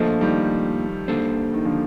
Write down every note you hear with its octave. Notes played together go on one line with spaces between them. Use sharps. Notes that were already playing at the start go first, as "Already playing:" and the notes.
Already playing: F3 A3 A#3 D4 F4 A4 D#5
D#3 G3
A#3 D4 A4 C5
D#3
D3 F3